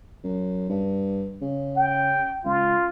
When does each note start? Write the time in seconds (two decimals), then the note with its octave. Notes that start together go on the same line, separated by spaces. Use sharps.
0.24 F#2
0.70 G2
1.42 C#3
1.77 G5
2.45 C#2 F4